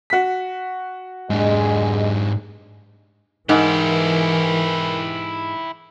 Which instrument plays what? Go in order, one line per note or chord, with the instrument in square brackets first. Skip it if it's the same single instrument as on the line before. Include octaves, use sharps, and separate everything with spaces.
[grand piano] F#4 B6
[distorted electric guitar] G#2 D4 [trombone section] G#3
[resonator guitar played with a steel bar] G#2 [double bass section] E3 [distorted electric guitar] E4 G4 [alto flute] A#4